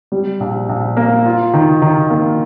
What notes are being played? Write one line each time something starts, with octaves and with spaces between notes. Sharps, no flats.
G3
A#1
A#1
A#3
F4
D#3
D#3
A#3